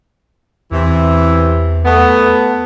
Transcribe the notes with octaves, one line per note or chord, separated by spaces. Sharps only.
E2 C3 E3
A3 B3